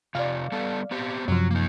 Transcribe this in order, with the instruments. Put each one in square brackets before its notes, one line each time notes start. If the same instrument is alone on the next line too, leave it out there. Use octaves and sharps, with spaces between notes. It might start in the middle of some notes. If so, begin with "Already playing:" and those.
[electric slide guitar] C3 F4 [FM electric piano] D5 F5
[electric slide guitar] G3 B3 A4
B3 C4 G4
[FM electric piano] F#2 C3 F3 [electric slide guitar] F#3
[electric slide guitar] A#3 D#4